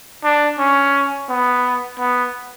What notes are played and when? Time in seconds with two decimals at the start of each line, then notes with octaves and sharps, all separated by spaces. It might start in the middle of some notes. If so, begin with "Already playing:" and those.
0.24 D4
0.59 C#4
1.29 B3
1.99 B3